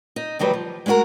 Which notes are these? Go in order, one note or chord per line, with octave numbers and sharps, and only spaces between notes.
D#4
D2 D#3 F#3 G3 B4
F3
G#3 A3 C#4 F#4 A#4